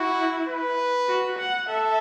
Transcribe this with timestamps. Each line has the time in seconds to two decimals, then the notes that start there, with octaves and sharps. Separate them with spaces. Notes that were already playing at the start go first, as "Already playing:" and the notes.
Already playing: E4 F#4
0.49 B4
1.08 F#4
1.39 F#5
1.69 A4 E5